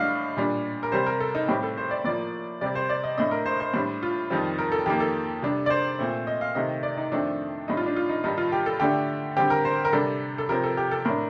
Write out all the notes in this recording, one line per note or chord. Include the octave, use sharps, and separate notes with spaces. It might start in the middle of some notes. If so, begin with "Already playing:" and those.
Already playing: A2 G3 D4 D#5 F5
A#2 G3 D4
A#4
C3 G3 C4 C5
A#4
A4
D#4
A2 G3 C4 G4
A4
C5
D5
A2 F3 A#3 D5
C3 G3 C4 D5
C5
D5
D#5
A2 A3 D4 D#5
A#4
C5
C5
A2 G3 D4
F4
F2 D#3 G3 C4
A#4
A4
F2 D#3 A#3 G4
A4
C3 G3 D4
D5
C5
A#2 A3 C4
D#5
F5
C3 D#3 A3 C4 D#5
D5
D#4
F2 D#3 A3 C4 D4
A2 G3 D4 D#4
F4
D4
F4
D#4
G2 D#3 G3 D#4
F4
G4
A4
D3 A3 D4 G4
D3 G3 C4 G4
A#4
C5
A#4
C3 G3 D4 A4
A4
C3 F3 C4 A#4
A4
G4
A4
A2 A3 D4 A#4